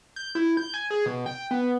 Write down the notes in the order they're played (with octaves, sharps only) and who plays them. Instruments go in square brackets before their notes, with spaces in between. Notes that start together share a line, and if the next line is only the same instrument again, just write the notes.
[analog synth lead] G6
E4
G6
G#5
G#4
B2
G5
B3